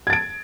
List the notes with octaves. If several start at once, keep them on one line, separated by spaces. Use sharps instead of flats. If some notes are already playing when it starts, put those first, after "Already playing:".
G#6 A6 D7